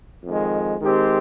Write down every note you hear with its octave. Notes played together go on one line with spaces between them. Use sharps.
F2 D#3 G#3
D#3 G#3 C4 G4